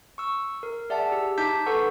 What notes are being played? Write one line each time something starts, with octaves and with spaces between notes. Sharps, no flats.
C#6 E6
A#4
G#4 D5 E5 F#5 A5
G4 E6
D#4 A5 D6 G6 B6
A4 B4 F#5 C#6 E6